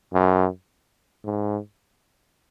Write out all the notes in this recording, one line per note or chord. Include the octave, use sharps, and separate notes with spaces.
F#2
G#2